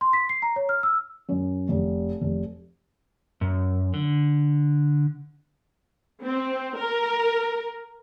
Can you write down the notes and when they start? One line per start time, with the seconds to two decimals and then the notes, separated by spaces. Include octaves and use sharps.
0.01 C6
0.13 B6
0.29 C7
0.42 A#5
0.56 C#5
0.69 F6
0.83 E6
1.29 F#2
1.69 F1
2.21 F1
3.41 F#2
3.94 D3
6.22 C4
6.77 A#4